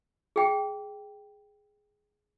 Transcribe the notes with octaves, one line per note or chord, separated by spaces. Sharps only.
G#4 G5